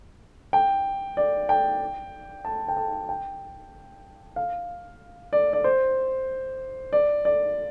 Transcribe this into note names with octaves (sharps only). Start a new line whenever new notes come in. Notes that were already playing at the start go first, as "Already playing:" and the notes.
G5
D5
G5
A5
G5
A5
G5
F5
D5
D5
C5
D5
D5